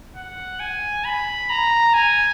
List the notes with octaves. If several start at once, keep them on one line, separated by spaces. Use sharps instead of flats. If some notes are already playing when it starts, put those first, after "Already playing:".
F#5
G#5
B5
A#5
G#5